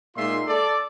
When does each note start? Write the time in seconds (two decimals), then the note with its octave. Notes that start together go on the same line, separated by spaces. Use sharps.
0.16 A#2 G#3 D#4 F4 E5 C6
0.47 A4 D5